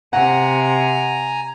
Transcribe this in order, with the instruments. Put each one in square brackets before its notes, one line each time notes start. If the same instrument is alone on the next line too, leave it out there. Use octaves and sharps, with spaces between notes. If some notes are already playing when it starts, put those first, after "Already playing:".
[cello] C3 [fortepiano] F#5 [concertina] G#5 A#5